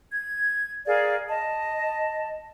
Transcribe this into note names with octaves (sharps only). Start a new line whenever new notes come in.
G#6
G#4 A#4 D5 F5
D#5 A5